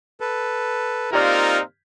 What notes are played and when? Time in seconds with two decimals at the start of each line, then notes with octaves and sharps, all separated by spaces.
0.20 A4 B4
1.13 A#3 C4 D#4 F4 G4 A#4 D5 F6